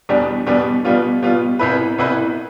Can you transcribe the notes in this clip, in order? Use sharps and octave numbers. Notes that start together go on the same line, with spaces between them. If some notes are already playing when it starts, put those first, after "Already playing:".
E2 B2 G3 B3 D4
E2 B2 G3 B3 D4
B2 G3 B3 F4
B2 G3 B3 F4
C2 B2 B3 E4 B4
C2 B2 B3 E4 B4